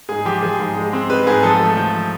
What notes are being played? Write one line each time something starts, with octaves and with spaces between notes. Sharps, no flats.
G#2 G#4
F3 G4
F3 G#4
G#2
G#3
C4
G#3 B4
G#2 G#4
F3 A4
A3
F3